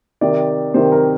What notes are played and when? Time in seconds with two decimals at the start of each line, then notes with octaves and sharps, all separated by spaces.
0.21 C3 D#3 D5
0.74 C3 D#3 C5
0.92 A#4